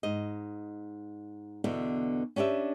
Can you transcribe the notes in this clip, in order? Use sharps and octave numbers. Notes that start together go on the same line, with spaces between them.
G#2 D#5
E2 B2 D3 E4
C#4 D4 G4 B4 E5